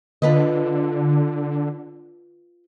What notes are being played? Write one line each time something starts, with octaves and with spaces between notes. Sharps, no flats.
D3 F4 B4 D#5